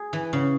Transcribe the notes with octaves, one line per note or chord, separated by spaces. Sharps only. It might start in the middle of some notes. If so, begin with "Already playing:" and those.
Already playing: G#4
E3
C#3